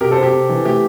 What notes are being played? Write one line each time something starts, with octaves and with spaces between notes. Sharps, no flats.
C3 G4 A#4
A4 C5
C3
G4
C3
E3
A3 G4